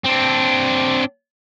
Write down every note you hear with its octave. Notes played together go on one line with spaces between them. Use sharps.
C4 D4